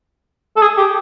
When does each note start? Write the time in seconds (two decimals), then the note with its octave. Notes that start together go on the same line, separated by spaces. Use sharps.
0.57 A4
0.62 G#4
0.78 G4